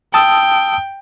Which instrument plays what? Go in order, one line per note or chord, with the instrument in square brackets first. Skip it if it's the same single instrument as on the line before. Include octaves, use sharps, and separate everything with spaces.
[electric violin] G5 [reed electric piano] A5 D#6 E6